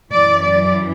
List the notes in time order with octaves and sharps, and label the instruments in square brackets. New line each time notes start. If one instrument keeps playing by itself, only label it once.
[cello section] F#2 E3 D5
D5